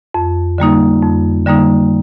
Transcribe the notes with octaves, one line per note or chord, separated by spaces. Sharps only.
F2
D3 G3 A#3 D#4
F2
D3 G3 A#3 D#4